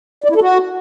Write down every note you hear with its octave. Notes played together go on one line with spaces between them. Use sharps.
D5
E4
A4
F#4